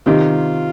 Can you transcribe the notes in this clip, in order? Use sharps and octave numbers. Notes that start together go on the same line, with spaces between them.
C3 D#3 F4